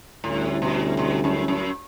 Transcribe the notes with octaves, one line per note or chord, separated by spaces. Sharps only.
D2 A2 D3 G3 C#4 E4
B2
B2
F#2
F#2